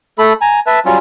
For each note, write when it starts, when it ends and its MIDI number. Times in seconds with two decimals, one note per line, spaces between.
0.18 0.33 57
0.18 0.33 69
0.18 0.33 83
0.41 0.60 80
0.41 0.60 82
0.67 0.79 71
0.67 0.79 76
0.67 0.79 81
0.85 0.98 54
0.85 0.98 55
0.85 0.98 61
0.85 0.98 65